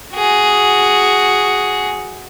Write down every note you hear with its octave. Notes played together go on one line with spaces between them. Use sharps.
F#4 G#4